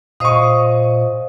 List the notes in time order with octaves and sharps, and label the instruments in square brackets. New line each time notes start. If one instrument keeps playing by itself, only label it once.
[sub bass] A#2 [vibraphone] C5 D#5 F5 [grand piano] C#6 D#6